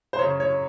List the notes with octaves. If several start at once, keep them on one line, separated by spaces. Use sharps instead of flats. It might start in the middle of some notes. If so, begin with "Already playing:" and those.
C5
F#2 C#3 C#5
C#5